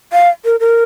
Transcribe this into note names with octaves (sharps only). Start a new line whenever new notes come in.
F5
A#4
A#4